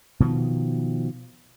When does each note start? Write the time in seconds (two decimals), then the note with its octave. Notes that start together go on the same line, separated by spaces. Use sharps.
0.20 B2 D#3 F3